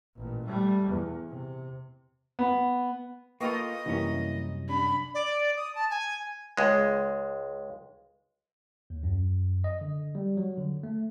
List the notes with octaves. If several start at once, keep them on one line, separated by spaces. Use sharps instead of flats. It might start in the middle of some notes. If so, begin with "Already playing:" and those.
A1 A#2
G3 A3
E2
C3
B3
A#3 F4 A4 B4 D#5 G5 C#6
C2 F#2 E3 A#3 C#4
D4 B5
D5
D#6
A5
G#5
C#2 G#3
D#2
F#2
D#5
D3
G3
F#3
D3
A3